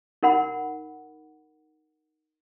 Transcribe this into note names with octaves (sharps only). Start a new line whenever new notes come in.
D#4 A#4 F#5 B5